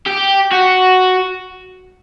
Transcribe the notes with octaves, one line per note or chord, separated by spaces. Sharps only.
G4
F#4